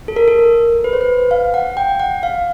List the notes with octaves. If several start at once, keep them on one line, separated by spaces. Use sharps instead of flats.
A4
A#4
A4
A#4
B4
C5
B4
F5
F#5
G5
F#5
F5